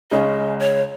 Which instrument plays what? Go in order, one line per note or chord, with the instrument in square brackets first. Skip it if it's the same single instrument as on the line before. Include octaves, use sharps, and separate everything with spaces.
[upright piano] C#2 C#3 G#3 C#4 G#4 [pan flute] D#5
[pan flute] C#5